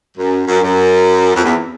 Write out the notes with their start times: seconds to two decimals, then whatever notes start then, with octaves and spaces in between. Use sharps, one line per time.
0.18 F#2
0.47 F#2
0.62 F#2
1.35 F2
1.44 E2